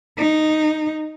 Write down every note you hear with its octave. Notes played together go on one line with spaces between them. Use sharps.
D#4